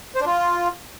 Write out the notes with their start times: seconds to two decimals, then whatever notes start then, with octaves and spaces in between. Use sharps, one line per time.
0.16 C5
0.21 D4
0.26 F4